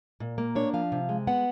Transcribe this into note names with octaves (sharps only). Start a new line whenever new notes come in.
A#2
A#3
D4 C#5
F3 F5
C3
G#3
B3 F#5